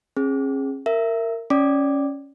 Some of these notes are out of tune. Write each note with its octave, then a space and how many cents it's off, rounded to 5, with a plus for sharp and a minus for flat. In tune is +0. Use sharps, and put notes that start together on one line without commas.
C#4 -40 G#4 +0
A#4 -20 E5 +15
C#4 +0 D5 +0 D6 +0